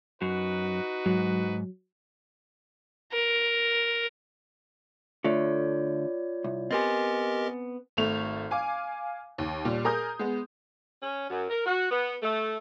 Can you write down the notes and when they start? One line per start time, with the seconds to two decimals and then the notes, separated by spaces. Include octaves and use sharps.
0.22 F#2 D#4 F#4 B4
1.06 G#2 F#3
3.12 A#4
5.24 D3 A3 F4 C#5 D5
6.44 C2
6.71 B3 C4 G4 A#4 D#5 G#5 C6 A6
7.97 G#1 A3 F7
8.51 F5 G#5 D6
9.38 D#2
9.65 A#2 G3
9.84 G#4 A#4 A#5 D#6 G6
10.19 G#3 B3
11.02 C#4
11.30 F#2
11.50 A#4
11.65 F#4
11.90 B3
12.22 A3